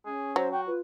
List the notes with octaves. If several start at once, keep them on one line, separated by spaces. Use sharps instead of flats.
C#4 G#4
F#3 C5
F#4 G5
F4 B4